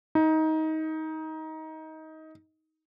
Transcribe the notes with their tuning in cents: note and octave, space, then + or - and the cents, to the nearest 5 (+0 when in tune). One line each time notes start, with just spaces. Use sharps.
D#4 +20